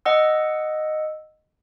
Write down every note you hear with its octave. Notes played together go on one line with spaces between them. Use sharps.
D#5 F#5 E6